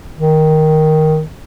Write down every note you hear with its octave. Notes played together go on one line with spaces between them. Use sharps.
D#3